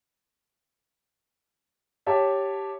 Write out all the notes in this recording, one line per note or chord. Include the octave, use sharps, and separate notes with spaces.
G4 C#5 E5 A5